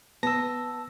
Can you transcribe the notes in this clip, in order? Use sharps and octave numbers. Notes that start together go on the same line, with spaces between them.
B3 A5 E6 A#6